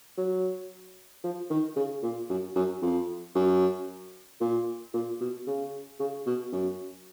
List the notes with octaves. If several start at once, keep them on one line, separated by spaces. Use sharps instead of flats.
F#3
F3
D#3
C#3
A#2
F#2
F#2
F2
F#2
A#2
A#2
B2
C#3
C#3
B2
F#2